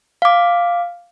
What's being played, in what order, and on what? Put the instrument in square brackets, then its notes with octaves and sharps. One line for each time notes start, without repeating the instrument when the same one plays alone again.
[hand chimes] F5 D6